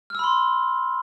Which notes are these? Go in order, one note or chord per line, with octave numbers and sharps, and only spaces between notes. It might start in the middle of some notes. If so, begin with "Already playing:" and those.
B5 C6 E6 F6